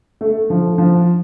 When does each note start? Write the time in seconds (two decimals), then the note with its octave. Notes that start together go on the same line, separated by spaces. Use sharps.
0.21 A3
0.50 F3
0.78 F3